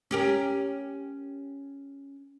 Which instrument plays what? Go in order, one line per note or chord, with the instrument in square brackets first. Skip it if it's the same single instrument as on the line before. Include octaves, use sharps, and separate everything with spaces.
[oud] C#4 G4 A#4